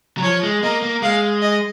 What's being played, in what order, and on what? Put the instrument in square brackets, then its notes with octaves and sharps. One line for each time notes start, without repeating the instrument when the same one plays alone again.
[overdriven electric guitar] F#3
[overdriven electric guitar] F3 [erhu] C#5
[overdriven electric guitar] G#3
[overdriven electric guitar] A#3 [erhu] D#5
[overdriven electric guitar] A#3
[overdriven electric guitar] G#3 [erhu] F5
[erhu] D#5